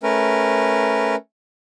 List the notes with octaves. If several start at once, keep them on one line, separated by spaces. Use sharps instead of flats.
A3 C#4 A#4 B4